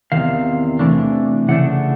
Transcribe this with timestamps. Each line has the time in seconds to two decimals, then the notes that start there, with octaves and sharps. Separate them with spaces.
0.12 E2 C3 D#3 F5
0.79 C3 E3 A3 D4
1.49 C#3 E3 A3 D4 F#5